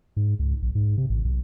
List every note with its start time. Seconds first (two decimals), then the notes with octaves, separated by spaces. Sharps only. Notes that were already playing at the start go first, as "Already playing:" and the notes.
0.17 G#2
0.39 C#2
0.62 A#1
0.75 G#2
0.98 C3
1.10 A1
1.25 B1